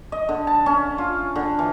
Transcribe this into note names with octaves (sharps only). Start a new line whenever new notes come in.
D#5
D3
A5
C#4
F4
D3
E3